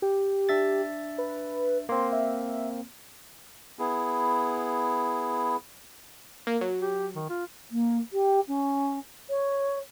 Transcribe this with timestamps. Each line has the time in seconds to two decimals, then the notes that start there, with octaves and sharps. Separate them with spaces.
0.02 G4
0.49 D4 E5 A6
1.18 B4
1.89 A#3 C4 C6
2.12 E5
3.79 B3 E4 G#4
6.47 A#3
6.61 F#3
6.81 G4
7.15 D#3
7.29 F4
7.71 A#3
8.13 G4
8.48 C#4
9.30 C#5